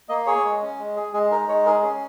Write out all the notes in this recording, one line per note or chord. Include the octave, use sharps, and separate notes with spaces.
A#3 D#5
G#4 C#5
G#3
C#4
G#3
G#4
G#3 G#4
D#4 A#4
G#3 C#5
G#4 A#4
C#4 G#4